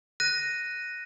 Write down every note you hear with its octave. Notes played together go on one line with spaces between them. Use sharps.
F#6 A#6 D#7